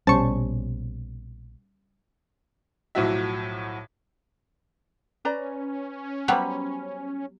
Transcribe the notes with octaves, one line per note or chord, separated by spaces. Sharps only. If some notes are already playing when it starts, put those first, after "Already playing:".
A#1 B2 G3 C#4 C5 A5 C#6
B1 A2 F3 F#3 F#4 E5
C#4 B4 D5 A#5
F#3 G3 B3 C5 B5